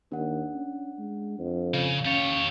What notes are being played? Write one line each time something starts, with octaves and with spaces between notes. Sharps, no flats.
D#2 D4 F#5
C#4
G#3
F2
C#3 F5
C#4 G4 C#5 F5 A6 C#7